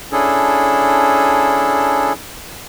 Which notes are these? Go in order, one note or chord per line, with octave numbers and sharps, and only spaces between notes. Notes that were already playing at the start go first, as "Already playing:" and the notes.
C#4 D4 E4 G#4 A4